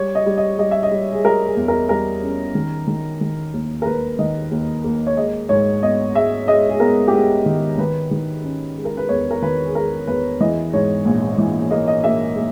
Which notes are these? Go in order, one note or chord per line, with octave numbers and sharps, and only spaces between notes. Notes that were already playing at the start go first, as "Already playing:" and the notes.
Already playing: G3 C#5
D#5
G3
D#5
G3 D#5
E5
D#5
G3
G#4
G3 A#4
G#4
E2
A#4
G3 A#4
C#4
D#3
D#3
D#3
D#2
A#4
D#2 B4
D#3 D#5
D#2
A#3
C#5
G#3 D#5
G#2 C#5
B3 D#5
G#3 E5
G#3 D#5
G#4
B3 A#4
G4
B3 G#4
D#3
D#3 B4
D#3
C#4
G#3
A#4
B4
E2 C#5
A#4
D#3 B4
G#4
G#3 A#4
E2 B4
E3 D#5
G#2 C#5
A#1
E3
A#3 D#5
D#5
A#3 E5
A#3